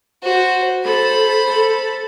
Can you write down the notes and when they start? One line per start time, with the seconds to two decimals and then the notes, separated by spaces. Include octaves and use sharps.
0.23 F#4 C5
0.84 A4 C5 B5
1.47 A4